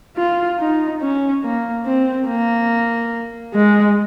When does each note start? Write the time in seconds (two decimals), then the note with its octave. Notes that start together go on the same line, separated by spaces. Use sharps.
0.17 F4
0.59 D#4
1.02 C#4
1.44 A#3
1.86 C4
2.28 A#3
3.54 G#3